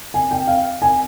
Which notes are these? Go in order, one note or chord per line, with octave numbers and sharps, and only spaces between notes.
G#5
G5
F5
G#5